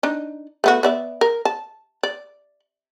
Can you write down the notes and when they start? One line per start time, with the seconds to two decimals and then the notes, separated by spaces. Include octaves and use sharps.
0.03 D4 D#4
0.64 A3 B3 F#4
0.83 B3 D5 E5
1.21 A#4
1.45 A5
2.03 D5